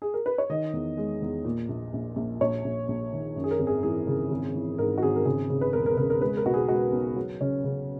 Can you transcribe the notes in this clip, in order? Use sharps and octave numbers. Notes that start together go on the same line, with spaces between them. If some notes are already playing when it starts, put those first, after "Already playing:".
G#4
A#4
B4
C#5
D#3 D#5
E2
G#3
E2
A#2
A#1
A#1
A#1
A#1 C#5
A#1
A#1
D#3
F#2
G#4
A#4
G#1
G#4
E3 G#4
C#3
G#1
E3
G#2 A#4
F#4
G#1 G#4
A#4
C#3 G#4
C#3
B4
E1 A#4
A#4
C#3 A#4
A#4
G#3 B4
A#4
B1 F#4
G#4
G#3 F#4
B1
F#3
C#3 C#4
C#3